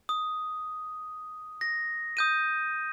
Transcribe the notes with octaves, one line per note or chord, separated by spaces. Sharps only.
D#6
A#6
D#6 G6 D#7